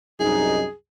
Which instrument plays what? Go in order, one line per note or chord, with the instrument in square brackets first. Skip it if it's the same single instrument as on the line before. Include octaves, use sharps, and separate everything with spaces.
[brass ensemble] C2 F#2 D#4 [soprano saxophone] G#4